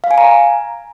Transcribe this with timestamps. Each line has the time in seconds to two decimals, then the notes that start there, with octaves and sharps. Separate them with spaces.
0.04 F5
0.11 G#5
0.18 A#5